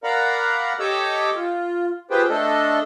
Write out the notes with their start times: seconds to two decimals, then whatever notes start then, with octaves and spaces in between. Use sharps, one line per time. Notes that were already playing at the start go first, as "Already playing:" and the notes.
0.04 A#4 D5 F5 F#5 A#5 B5
0.80 G4 A4 C#5 D#5 D6 E6
1.36 F4
2.11 F4 G4 G#4 B4 C5 G5
2.30 A3 D4 A4 D#5